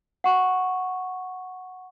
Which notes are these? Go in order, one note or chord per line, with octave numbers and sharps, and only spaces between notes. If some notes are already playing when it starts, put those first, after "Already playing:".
F#5 C#6